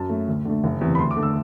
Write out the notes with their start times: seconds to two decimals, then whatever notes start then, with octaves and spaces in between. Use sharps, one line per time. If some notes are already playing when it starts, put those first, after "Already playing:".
Already playing: F#2 A5
0.09 F#3 A3
0.27 D2
0.45 D3 A3
0.64 F#1
0.81 E2 C3
0.95 B5
0.99 D2 C6
1.11 D6
1.17 D3 A3
1.23 E6